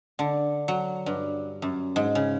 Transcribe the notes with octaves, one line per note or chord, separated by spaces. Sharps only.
D3
F#3
G2
F#2
G#2
C#3